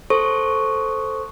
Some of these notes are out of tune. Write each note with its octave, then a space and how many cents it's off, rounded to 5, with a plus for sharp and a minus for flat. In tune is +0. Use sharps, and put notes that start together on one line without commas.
A4 +5 C5 +0 C#6 +0